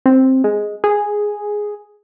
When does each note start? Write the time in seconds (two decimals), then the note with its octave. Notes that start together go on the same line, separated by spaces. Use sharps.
0.06 C4
0.44 G#3
0.84 G#4